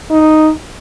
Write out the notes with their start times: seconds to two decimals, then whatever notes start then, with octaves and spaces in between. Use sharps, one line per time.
0.11 D#4